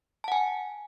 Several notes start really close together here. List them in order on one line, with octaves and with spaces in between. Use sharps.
A5 F#5 G#5